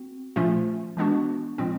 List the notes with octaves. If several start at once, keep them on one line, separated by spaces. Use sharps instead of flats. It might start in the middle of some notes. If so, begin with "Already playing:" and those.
Already playing: C4 F#4
A#2 F3 A3 C#4 F4
E3 G#3 B3 D4 F#4
A#2 F3 G#3 C4